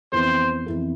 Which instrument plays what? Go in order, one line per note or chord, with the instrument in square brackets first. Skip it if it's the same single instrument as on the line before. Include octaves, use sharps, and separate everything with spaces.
[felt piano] F2 E3 B3 [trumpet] C5
[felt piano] F2 E3 B3